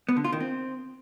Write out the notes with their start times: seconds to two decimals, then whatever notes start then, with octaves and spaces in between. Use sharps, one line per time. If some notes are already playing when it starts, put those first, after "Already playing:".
0.09 B3
0.16 D3
0.24 F4
0.32 D#3
0.40 C4